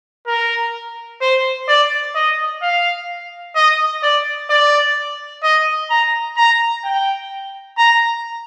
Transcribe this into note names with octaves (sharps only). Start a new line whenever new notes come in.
A#4
C5
D5
D#5
F5
D#5
D5
D5
D#5
A#5
A#5
G5
A#5